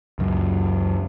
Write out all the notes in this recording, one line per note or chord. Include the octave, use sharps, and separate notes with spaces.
C#2 F#2